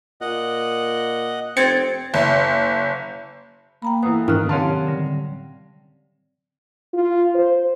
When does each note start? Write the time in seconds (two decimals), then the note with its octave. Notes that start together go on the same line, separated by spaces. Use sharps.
0.21 A#2 D#5 F#5
1.57 F1 C4 G#6 A6 C#7
2.14 F#1
3.82 A#3 G5 A#5 B5
4.03 A2 E3 B3 D#6
4.28 G#2 D#3 E3 F6 F#6
4.49 C3 D#3 F#3 C4 C#4 F5 A5
4.87 D3 G3
6.94 F4
7.35 C5